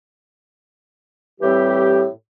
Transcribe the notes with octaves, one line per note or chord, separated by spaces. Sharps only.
A2 E3 G3 C4 G4